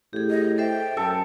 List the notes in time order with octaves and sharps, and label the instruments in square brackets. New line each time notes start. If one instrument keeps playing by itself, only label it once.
[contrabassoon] A2 [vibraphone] G4 G#4
[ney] D#5
[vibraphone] A4 C5 E5 [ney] G5
[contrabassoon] F#2 [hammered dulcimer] A4 [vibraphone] G#5